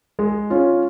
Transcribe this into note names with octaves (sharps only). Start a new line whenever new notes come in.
G#3
C#4 F4